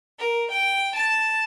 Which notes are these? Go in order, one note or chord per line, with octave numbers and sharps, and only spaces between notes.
A#4
G5
A5